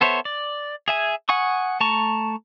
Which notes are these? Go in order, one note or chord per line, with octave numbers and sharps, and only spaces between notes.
B3 A4 C5 C#5 E5
D5
G#4 E5 G#5
F#5 G#5 C#6 D#6
A3 A5 A#5 C#6